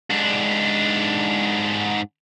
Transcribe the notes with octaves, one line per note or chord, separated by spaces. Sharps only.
G#2 D4